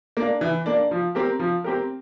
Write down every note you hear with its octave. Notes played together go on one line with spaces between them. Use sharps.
A#3 D4
E3
A#3 D4
F3
C4 G4 A#4
F3
C4 G4 A#4